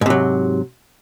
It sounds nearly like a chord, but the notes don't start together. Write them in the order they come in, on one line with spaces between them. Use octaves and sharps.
G#2 C3 F#3